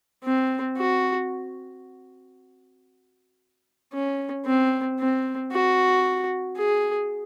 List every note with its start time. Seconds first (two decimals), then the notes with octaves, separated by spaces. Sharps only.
0.24 C4
0.77 F#4
3.93 C#4
4.46 C4
5.00 C4
5.52 F#4
6.57 G#4